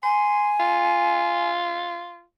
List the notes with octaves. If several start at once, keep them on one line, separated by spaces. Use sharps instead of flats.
G#5 C6
F4